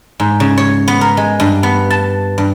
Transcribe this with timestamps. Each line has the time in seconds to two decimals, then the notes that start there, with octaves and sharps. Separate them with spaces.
0.20 G#2
0.40 C#3
0.58 C#5
0.88 B3
1.01 A#4
1.17 G#3
1.40 G2
1.63 B3
1.90 A5
2.38 G2